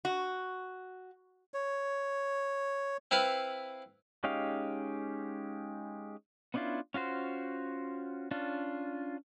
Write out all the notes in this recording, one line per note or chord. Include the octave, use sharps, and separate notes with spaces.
F#4
C#5
C4 E4 B4 F5
G#3 C#4 D#4 G4 F5
B3 C#4 D4 E4 F4
C#4 F4 F#4 C5
C#4 D4 F4